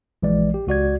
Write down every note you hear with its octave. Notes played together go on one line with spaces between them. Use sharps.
A#1 E3 G#3 D5
G4
C#2 F#4 D5 G#6